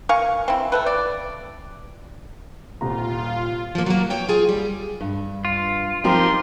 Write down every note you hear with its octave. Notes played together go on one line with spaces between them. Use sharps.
A#4 F5 G#5 C#6
C4 E4
A3 A4 B4
D5
D#1 C2 F4 A#5
F3 A#3
F#3 A#3
E2 C#5 G5
F4 G#4
G3
G2
F4
F3 C4 D#4 G4 A#4 C6